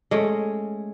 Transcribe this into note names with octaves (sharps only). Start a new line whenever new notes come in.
G#3 A3 C#4